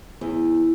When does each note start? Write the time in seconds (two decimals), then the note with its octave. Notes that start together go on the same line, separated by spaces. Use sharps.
0.21 E2